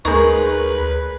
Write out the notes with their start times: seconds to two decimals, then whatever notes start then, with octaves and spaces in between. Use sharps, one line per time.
0.05 D2 G#3 D#4 A#4 B4 A#5 C#6